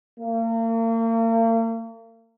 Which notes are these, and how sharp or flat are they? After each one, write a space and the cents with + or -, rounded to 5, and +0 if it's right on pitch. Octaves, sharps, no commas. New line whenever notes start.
A#3 -40